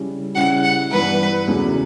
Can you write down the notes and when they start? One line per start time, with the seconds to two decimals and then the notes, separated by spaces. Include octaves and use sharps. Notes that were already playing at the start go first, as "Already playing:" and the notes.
Already playing: C#3 G3 C#4 E4
0.35 C#3 G3 C#4 E4 F#5
0.63 F#5
0.91 G2 E3 B3 D4 B4
1.47 E2 C#3 F#3 A3 C#4